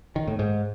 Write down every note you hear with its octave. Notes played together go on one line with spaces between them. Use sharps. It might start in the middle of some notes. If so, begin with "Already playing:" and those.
D#3
A2
G#2